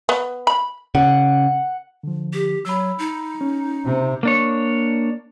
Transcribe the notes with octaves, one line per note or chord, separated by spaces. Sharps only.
B3
B5
C#3 F#5
D3 F3
G4
F#3 B5 E6
D#4
C#4
C3
A#3 D4 C#5